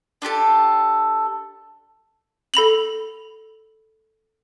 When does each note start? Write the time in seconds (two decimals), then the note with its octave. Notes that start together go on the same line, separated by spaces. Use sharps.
0.22 D4 F4 G4 A4
2.54 A4 B5 F7 F#7